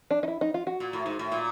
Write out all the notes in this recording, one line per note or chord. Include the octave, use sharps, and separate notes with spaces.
D4
D#4
E4
D#4
F4
F#4
A#2
A2
G#2
A2
A#2